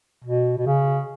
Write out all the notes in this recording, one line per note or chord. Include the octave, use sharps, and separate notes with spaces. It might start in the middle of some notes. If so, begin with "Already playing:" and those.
B2
B2
C#3